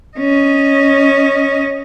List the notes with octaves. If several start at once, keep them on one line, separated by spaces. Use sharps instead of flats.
C#4 D#5